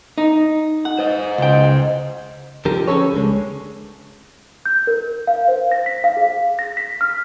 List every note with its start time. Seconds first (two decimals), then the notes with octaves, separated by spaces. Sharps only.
0.18 D#4
0.85 F#5
0.99 C5 D#5
1.38 C#2 G5
2.65 D3 F3 G4 A#4
2.87 C#4 D#4 G#4 A4 B4 C#5
3.13 C#2 D3 G#3
4.65 G6
4.87 A#4
5.27 F5
5.48 C5
5.72 A#6
5.86 B6
6.04 F5
6.17 G#4
6.59 A#6
6.77 B6
7.01 F6